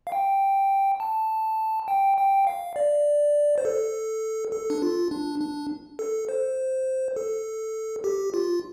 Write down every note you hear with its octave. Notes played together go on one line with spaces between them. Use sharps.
F5
G5
A5
G5
G5
F5
D5
C5
A4
A4
D4
F4
D4
D4
A4
C5
A4
G4
F4